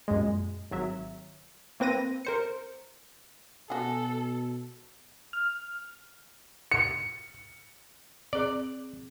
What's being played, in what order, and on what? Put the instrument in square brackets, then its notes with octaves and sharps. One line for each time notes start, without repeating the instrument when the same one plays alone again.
[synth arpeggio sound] F#2 A#2 G#3
G#1 F#3 E5
A#3 C4 B4 A#6 D#7
A#4 C5 C#7
[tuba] B2 [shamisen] F#4 G#4 [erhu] A4
[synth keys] F6
[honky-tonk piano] C#7
[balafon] C4 G#4 [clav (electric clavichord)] D5